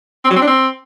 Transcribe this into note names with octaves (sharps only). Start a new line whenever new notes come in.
C4
F#3
C4
D4
C4